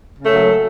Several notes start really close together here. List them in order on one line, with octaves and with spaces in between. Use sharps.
C#3 A3 C#4 A#3 F#3